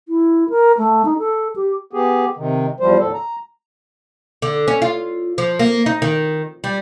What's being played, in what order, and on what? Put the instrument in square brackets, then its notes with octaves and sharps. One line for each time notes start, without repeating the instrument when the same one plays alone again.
[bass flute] E4
A#4
A3
D#4
A4
G4
[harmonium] B3 G4 G#4
C3 D#3
E2 F3 G3 C5
E2 A2 D3 A4
A#5
[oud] D3
C#4
F4
F3
A#3
D#4
D#3
G3